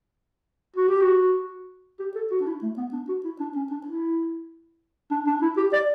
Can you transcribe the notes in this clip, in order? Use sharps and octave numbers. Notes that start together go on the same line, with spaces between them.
F#4
G4
F#4
G4
A4
F#4
D4
E4
A3
B3
D4
F#4
E4
D4
C#4
D4
E4
D4
D4
E4
G4
D5